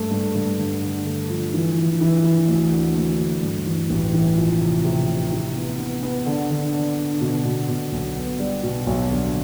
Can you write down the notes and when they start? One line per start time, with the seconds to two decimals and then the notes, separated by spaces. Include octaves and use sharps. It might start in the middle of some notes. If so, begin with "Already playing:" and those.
Already playing: G2 A3
0.11 G2
0.35 G2
0.58 D3
0.82 D3
1.06 A3
1.30 F3
1.53 E3
1.77 E3
2.01 E3
2.24 E3
2.48 D2
2.72 D3
2.95 D2
3.19 D2
3.42 G2
3.66 E3
3.90 A1
4.13 E3
4.37 F3
4.61 C3
4.84 C3
5.08 C3
5.32 E4
5.56 B3
5.79 B3
6.02 B3
6.26 D3
6.50 D3
6.74 D4
6.98 D3
7.21 B2
7.45 B2
7.68 B2
7.92 B1
8.16 B3
8.39 G3
8.63 B2
8.87 B1
9.10 D3